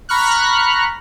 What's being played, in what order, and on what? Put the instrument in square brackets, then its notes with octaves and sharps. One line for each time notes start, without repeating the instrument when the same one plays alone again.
[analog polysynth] A#5 B5 C#6 F6 F#6